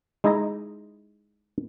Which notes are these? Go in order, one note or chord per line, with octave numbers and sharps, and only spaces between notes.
G#3 D#4 E4 G#4 D#5 A#5